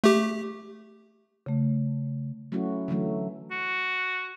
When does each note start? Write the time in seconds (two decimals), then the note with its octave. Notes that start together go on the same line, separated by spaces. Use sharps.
0.04 A3 G4
1.46 C#3 A3
2.52 F#3 A3 C#4 E4 F#4
2.88 D3 E3 F#3 A3
3.51 F#4